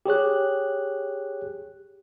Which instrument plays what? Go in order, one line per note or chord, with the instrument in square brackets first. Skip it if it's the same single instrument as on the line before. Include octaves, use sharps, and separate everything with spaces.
[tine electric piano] G4 G#4 C#5 F#6